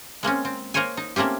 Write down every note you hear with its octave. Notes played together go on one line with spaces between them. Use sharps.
G#3 A#3 C4 C#4
C4
A#3 A#4 C5 C#5 G#5
D#4
A3 A#3 C4 C#4 G4